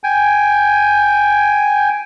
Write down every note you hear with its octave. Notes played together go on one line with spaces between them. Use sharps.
G5 G#5